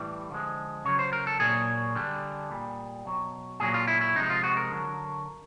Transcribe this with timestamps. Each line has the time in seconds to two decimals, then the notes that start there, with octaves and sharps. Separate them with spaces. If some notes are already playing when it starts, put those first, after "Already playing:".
Already playing: A2 E3 G3
0.31 D3 F3 G#3
0.85 C#3 F#3 C#5
0.99 C5
1.13 A#4
1.27 A4
1.40 A#2 F#3 G#4
1.95 D3 G3
2.50 A#2 G3
3.05 B2 F#3
3.60 A#2 F#3 G#4
3.74 F4
3.88 E4
4.01 E4
4.16 C3 F3 G#3 D#4
4.30 F4
4.44 F#4
4.57 A#4
4.71 D3 F#3